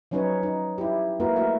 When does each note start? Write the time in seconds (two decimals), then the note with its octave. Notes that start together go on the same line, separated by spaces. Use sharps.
0.11 F3 F#3 C#4 D#4 B4 C#5
0.43 D#4
0.78 E4 G4
1.20 G#3 A#3 E4 F#4 A#4 B4
1.36 A3 E4 F#4 A#4 E5